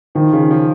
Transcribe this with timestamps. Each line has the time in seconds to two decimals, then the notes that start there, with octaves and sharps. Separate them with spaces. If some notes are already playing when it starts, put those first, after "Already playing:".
0.15 D#3 F3
0.33 C#3
0.51 F3